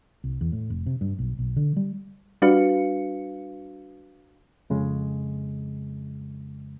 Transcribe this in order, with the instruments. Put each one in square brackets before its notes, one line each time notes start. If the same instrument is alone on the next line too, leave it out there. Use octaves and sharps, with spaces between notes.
[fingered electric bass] C2
E2
A2
F1
C3
G2
B1
B1
D3
G3
[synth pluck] G3 D4 F#4 B4 F5 C#7
[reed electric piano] F2 C#3 G#3